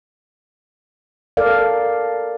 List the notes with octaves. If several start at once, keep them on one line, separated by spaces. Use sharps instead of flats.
A4 A#4 D5 F5